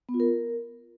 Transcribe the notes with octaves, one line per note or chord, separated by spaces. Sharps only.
B3
F4
A#4